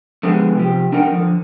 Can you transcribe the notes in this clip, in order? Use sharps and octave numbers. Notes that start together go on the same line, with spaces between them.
D3 F3 G#3 B3 G4 G#4
C3 F3 G4
D4 D#4 A#4 D#5 F#5 G5
D3 F3